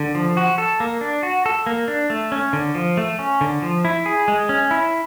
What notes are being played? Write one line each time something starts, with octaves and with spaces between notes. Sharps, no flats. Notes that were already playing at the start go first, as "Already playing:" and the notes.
Already playing: D3
F3
F#4
A4
A#3
D4
F#4
A4
A#3
D4
A3
C#4
D3
F3
A3
C#4
D3
F3
E4
G#4
G#3
C#4
E4